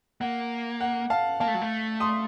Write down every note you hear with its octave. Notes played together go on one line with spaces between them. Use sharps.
A#3 F#5
F#5
F5 A5
A#3 F5 A5
A3
F#3
A3
C6 D#6